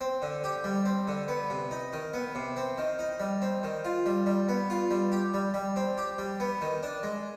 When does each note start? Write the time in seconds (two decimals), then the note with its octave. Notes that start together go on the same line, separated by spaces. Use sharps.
0.01 C4
0.22 D3
0.44 G4
0.64 G3
0.86 C4
1.07 D3
1.28 B3
1.50 C3
1.71 D#4
1.93 D#3
2.14 B3
2.35 C3
2.56 C4
2.78 D#3
2.99 D#4
3.20 G3
3.42 C4
3.63 D#3
3.85 F4
4.06 G3
4.26 G3
4.49 B3
4.70 F4
4.91 G3
5.12 G4
5.34 G3
5.54 G3
5.76 C4
5.98 G4
6.18 G3
6.40 B3
6.61 D#3
6.83 D4
7.03 G#3